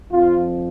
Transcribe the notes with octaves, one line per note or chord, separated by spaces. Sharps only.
F2 F3 F4